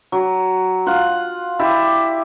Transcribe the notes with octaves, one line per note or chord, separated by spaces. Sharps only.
F#3
F4 F#5
E4 G4 D5 E5